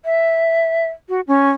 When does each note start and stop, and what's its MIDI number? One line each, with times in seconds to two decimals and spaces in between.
0.05 0.86 76
1.09 1.21 66
1.27 1.50 61